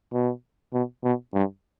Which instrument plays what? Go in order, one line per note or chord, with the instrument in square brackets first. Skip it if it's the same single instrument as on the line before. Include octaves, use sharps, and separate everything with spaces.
[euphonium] B2
B2
B2
G2